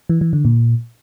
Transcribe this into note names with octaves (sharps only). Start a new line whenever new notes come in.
E3
E3
D3
A#2